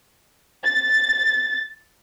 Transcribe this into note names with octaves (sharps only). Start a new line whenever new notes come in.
A6